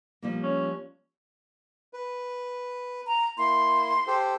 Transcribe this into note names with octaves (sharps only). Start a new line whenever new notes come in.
F3 G3 A#3
C#4
B4
A#5
A#3 E4 C6
G4 A4 C5